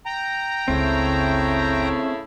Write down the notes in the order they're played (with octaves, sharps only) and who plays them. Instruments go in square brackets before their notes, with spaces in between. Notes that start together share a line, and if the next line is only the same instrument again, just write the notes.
[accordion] G5 A#5
[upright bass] F#1 C#2 [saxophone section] C#3 A3 E4 [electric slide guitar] C4